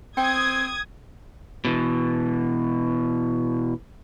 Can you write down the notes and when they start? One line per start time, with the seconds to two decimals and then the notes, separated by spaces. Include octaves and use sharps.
0.17 C4 G5 D#6 G#6
1.65 B2 E3